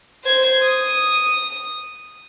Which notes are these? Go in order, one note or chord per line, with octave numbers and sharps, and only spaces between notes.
C5 G#6
D#6